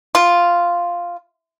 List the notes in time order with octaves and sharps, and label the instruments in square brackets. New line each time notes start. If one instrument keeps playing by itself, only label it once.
[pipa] F4